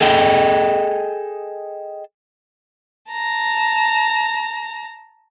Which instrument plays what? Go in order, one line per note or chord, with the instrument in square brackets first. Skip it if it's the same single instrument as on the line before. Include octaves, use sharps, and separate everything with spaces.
[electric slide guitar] G#4 A4 D#5 G5
[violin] A5 A#5